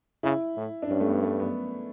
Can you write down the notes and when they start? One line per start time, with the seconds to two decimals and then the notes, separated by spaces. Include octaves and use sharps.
0.23 C#3 E4
0.57 A2
0.82 D4
0.89 G2 C#4
1.00 A3
1.07 B3
1.23 A3
1.40 B3